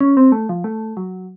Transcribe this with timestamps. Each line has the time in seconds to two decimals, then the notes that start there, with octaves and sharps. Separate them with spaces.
0.01 C#4
0.17 C4
0.32 A3
0.49 F3
0.64 A3
0.97 F#3